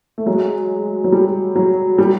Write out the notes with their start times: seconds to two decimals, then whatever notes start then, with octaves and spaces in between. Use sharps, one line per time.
0.18 A3
0.26 F#3 G#3
1.04 F#3
1.12 G3
1.56 F#3
1.98 G3